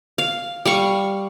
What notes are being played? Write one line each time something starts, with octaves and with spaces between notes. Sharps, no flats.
F5
G3 F5 C#6